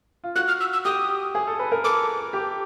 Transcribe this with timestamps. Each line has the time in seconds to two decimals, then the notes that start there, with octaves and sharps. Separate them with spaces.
0.24 F4
0.35 F#4 F#6
0.48 F6
0.60 E6
0.73 E6
0.85 G4 D#6
1.35 G#4
1.47 A4
1.59 B4
1.72 A#4
1.84 A4 D6
2.33 G4